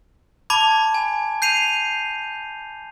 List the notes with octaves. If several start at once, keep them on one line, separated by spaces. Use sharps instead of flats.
A5 B5 D6 G#6
G#5
G6 C7 D#7 F7